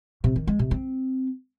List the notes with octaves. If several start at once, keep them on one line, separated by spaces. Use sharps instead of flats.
C3
D#3
G#3
C3
C4